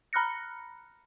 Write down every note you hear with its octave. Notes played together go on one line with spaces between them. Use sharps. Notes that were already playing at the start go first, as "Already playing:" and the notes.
A#5 B5 F6 F#6 A#6 C#7